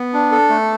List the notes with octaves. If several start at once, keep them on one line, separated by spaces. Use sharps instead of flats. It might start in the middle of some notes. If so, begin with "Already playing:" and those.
Already playing: B3
D4
A4
A3